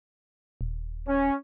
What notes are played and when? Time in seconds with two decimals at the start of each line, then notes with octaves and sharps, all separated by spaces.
0.61 D#1
1.07 C#4